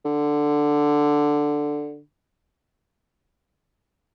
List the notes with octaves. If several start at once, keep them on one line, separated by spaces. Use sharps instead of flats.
D3